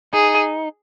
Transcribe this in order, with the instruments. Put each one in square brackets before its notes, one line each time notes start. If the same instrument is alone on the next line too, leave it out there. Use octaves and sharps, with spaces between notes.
[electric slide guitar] D#4 [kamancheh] G#4